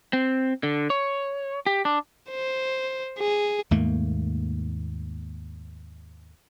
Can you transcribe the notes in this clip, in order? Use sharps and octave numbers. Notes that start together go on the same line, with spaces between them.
C4
D3
C#5
G4
D4
C5
G#4
D#2 G#2 A3 A#3